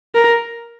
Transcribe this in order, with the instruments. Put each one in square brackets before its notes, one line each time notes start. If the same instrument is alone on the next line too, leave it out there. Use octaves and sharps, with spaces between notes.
[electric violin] A#4